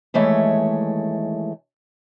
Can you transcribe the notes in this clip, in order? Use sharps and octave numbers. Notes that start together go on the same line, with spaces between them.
D#2 E3 G#3 A3 C#5 E5